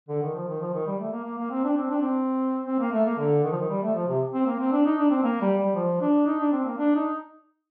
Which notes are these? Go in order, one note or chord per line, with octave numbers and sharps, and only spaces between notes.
D3
D#3
F3
D#3
F3
D#3
G3
A3
A#3
A#3
A#3
C4
D4
C4
D4
C4
C4
A#3
A3
A#3
D3
D#3
F3
D#3
G3
A3
F3
C3
C4
A#3
C4
D4
D#4
D4
C4
A#3
G3
G3
F3
D4
D#4
D4
C4
A#3
D4
D#4